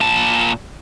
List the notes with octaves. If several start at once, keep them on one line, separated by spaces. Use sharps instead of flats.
A#2 A5